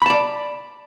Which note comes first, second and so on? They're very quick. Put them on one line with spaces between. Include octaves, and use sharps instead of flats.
B5 A5 D5